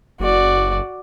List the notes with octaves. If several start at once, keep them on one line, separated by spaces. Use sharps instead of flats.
F#1 F#4 D5